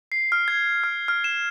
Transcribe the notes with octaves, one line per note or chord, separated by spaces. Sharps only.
C7
F6
G#6
F6
F6
E7